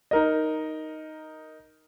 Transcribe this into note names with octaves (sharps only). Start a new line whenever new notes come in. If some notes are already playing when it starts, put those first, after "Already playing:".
D#4 A#4 D#5